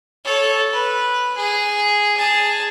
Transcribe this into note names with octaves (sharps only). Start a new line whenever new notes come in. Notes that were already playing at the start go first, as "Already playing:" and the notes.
A4 C#5
B4
G#4
G#4 A5